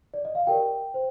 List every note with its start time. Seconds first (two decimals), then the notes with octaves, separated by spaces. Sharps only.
0.14 D5
0.25 D#5
0.35 F5
0.47 G4 A#4 D5 G5
0.94 C5